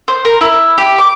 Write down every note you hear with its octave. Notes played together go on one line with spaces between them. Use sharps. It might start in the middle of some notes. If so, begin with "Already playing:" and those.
C5
A#4
E4
G4
D6